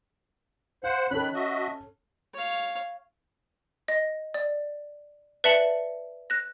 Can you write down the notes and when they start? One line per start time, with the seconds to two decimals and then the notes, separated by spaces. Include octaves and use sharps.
0.84 C5 F5 F#5
1.11 D#3 C#4 A4 B5 F#6
1.34 F#4 D#5 E5
2.34 C#5 F5
3.88 D#5
4.34 D5
5.44 B4 D5 E5 A5 C#7 F#7
6.30 F#6 A#6